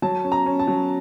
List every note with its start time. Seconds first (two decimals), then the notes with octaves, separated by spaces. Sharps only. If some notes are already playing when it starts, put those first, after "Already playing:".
0.02 F#3 A5
0.24 C#4
0.32 A#5
0.46 C#4
0.59 A5
0.67 F#3